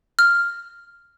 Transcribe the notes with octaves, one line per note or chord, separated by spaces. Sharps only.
F6